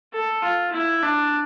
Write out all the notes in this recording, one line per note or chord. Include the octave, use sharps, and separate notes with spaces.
A4
F4
E4
D4